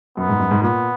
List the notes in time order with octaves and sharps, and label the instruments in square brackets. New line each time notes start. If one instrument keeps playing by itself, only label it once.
[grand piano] F#2 [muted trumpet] B3
[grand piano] G#2
F#2
G#2
[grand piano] A#2 [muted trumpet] B3